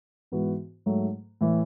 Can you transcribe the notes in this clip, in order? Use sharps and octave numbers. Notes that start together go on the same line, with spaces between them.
G#2 E3 B3 F#4
G#2 F#3 A3
A2 E3